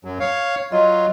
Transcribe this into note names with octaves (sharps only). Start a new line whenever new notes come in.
F#2 F#3
C#5 F5
F#3 F4 D#5